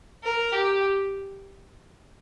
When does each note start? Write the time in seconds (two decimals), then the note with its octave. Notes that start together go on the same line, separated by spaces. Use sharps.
0.24 A#4
0.53 G4